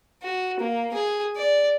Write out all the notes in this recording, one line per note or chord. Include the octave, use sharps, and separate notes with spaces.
F#4
A#3
G#4
D5